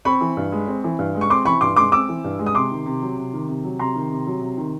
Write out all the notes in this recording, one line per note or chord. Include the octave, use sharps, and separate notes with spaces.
C4 B5 C#6
E3
G2
G#3
C4
E3
G2
G#3
C#6
C4 C6 D6
E3 B5 C#6
G2 C6 D6
G#3 C6 D6
C4 D6 E6
E3
G2
G#3
D#6
C3 C6 D6
D#3
C3
F#3
C3
D#3
C3
F#3
C3 A#5 C6
D#3
C3
F#3
C3
D#3